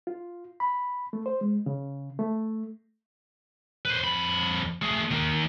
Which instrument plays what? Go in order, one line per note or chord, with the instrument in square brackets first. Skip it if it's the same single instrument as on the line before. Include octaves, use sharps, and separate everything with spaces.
[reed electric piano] F4
B5
A3
C5
G#3
C#3
A3
[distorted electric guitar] B4 C5
F2 B5
A3 G#4
D#3 A#3